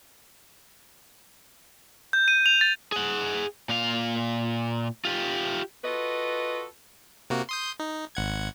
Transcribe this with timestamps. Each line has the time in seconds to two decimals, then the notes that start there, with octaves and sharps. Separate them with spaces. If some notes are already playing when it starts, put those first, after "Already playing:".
2.13 G6
2.28 D#7
2.46 F7
2.61 A6
2.92 G#4 F#5
3.69 A#2 F5
5.05 F4 G4
5.84 F4 F#4 A4 B4 D#5
7.30 C3 A#3 F#4
7.49 C6 D#6 G6
7.80 D#4
8.15 G#1 F#5 G#6